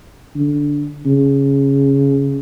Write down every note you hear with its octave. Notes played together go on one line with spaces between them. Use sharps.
D3
C#3